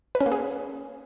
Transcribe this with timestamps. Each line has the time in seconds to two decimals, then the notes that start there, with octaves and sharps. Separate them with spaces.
0.15 B4
0.20 C#4
0.26 A#3
0.32 G#4